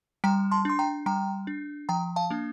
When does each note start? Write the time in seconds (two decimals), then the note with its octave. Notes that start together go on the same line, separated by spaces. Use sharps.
0.24 G3 G5 A#5
0.51 A5 C6
0.65 D4 C6
0.79 G5 A#5
1.06 G3 G5 A#5
1.47 D4
1.89 F3 G5 A#5
2.16 F5 A5
2.30 A#3 D4